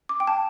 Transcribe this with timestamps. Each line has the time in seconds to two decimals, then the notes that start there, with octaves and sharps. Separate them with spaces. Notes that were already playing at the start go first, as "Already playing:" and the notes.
0.09 D6
0.20 G5
0.27 A5